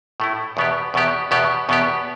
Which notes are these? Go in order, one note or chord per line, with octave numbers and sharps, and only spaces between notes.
A2 A3 E4
E2 B2 B3 G4
E2 B2 B3 G4
E2 B2 B3 G4
E2 B2 B3 G4